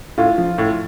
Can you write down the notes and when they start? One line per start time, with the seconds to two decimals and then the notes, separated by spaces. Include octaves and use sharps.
0.18 A2 F4
0.38 F3
0.58 A2